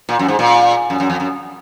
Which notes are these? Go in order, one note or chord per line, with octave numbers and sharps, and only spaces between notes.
A#2
F#2
G#2
A#2
F#2
F#2
F2
F#2